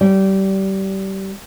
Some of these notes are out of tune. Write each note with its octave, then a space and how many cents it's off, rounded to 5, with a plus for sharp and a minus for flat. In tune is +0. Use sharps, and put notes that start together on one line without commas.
G3 -25